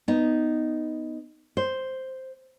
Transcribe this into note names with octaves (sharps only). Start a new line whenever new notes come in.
B3 D#4
C5